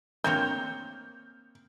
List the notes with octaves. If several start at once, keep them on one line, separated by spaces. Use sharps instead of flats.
A#3 C4 C#5 G6